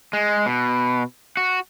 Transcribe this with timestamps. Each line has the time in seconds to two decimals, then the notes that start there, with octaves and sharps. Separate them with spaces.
0.13 G#3
0.46 B2
1.37 F#4